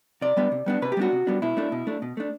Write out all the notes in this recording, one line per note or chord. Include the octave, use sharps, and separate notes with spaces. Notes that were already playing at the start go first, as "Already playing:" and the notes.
C3 D5
G3 B3 D4
C3
G3 B3 D4
C3 B4
G4
G3 B3 D4 F#4
C3
G3 B3 D4
B2 E4
A3 D4
B2
A3 D4
B2
A3 D4